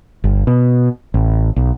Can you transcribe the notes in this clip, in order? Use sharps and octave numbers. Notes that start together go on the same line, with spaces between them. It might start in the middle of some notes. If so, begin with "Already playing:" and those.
G1
B2
A1
B1